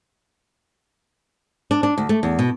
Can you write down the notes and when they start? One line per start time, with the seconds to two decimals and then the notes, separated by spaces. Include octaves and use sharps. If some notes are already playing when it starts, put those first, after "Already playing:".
1.71 D4
1.83 D4
1.98 D2
2.09 A3
2.23 E2
2.39 B2